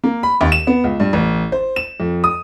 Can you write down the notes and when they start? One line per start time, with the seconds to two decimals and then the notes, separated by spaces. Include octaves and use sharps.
0.04 A#3
0.23 B5
0.41 D#2
0.52 E7
0.67 B3
0.84 C#2
1.00 G2
1.13 A1
1.52 C5
1.76 E7
2.00 F2
2.24 D#6